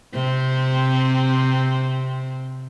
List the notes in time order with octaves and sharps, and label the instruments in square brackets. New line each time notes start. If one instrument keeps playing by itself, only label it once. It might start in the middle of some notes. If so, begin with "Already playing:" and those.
[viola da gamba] C3 C4